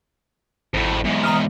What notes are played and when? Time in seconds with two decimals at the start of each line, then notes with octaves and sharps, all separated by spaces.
0.74 G#1 F2 A2
1.04 E2 G#2
1.24 A#5 D#6 F6